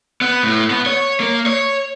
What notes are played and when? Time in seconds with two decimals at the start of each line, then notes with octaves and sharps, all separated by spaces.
0.21 B3
0.43 A2
0.70 B3
0.86 C#5
1.20 A#3
1.46 C#5